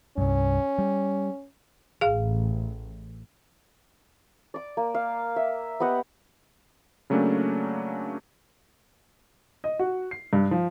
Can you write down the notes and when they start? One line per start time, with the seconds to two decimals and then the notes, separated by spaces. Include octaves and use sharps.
0.18 C2 G2 C#4
0.79 G3
2.01 A1 G#4 F5
4.54 D5 D6
4.77 A#3
4.94 F5
5.36 E5
5.80 B3 G4 D#5 F#5
7.10 C#3 F#3 A3 A#3 C#4 D4
9.64 D#5
9.79 F#4
10.11 C7
10.33 G2
10.51 F3